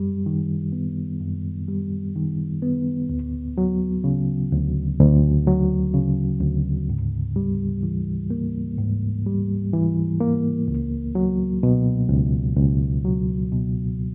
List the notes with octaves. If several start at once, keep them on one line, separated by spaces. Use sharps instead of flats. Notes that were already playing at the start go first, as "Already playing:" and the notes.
Already playing: F#2 G3
D#3
B3
F#2
G3
D#3
B3
D2
F#3
C#3
D2
D2
F#3
C#3
D2
G#2
G3
E3
A#3
G#2
G3
E3
A#3
C#2
F#3
B2
C#2
C#2
F#3
B2